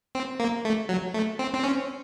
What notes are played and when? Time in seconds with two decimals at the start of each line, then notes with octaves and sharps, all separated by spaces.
0.15 C4
0.40 A#3
0.65 A3
0.89 F#3
1.14 A3
1.39 C4
1.55 C4
1.64 C#4